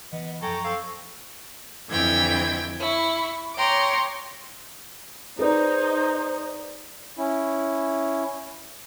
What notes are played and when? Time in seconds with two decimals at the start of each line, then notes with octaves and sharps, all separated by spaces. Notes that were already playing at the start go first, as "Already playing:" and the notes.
0.13 E3 B3 D#5
0.42 F#2 F3 F#3 A4 G5 G#5 A#5 C#6
0.64 C4 A4 F5
1.89 F2 D3 E3 G5 G#6
2.79 E4 C#6
3.56 C#5 G5 A#5 C6 D6
5.39 D#4 G#4 B4 C5 D5
7.18 C#4 E4